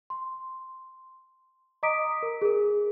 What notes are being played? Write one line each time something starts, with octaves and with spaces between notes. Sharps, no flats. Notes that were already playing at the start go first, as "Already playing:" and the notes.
C6
D#5 A#5 D6 D#6 B6 D7
A#4
G#4 A#4